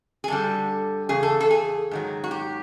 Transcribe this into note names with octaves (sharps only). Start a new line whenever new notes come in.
G#4
G2 D3 G3 A4
E2 C#3 G#4
A4
A4
G#4
G#2 D#3 F#3
F#4
G4